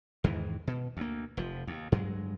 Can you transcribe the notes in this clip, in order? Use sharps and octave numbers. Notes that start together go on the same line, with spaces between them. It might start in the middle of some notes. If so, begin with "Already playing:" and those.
E2 G#2 D#3 E3
B2
D2 A#3
F1 F3
D#2
G2 F#3 G#3